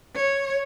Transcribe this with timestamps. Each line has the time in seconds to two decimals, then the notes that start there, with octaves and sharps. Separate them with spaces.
0.15 C#5